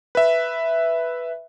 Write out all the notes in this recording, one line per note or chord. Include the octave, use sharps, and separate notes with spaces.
B4 E5